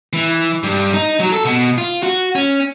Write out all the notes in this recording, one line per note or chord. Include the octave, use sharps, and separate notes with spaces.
E3
G2
D#4
F#3
A4
B2
F4
F#4
C#4